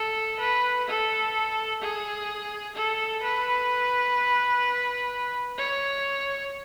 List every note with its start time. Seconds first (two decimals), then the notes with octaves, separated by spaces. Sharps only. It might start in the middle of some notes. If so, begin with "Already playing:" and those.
Already playing: A4
0.39 B4
0.87 A4
1.81 G#4
2.75 A4
3.22 B4
5.58 C#5